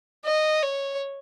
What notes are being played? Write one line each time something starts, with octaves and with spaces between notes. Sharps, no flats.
D#5
C#5